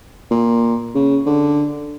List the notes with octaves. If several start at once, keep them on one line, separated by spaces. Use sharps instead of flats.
A#2
C#3
D3